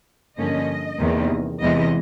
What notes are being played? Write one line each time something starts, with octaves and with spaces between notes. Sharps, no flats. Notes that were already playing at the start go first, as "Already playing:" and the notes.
G2 D3 F3 A#3 C#4 D#5
E2 C3 D#3 G3 A#3
E2 C3 E3 G#3 D#5